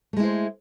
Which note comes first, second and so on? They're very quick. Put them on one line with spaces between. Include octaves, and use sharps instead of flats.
A3 G#3 E4 C5